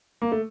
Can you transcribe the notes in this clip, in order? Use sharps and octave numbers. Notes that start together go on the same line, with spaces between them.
A#3
A3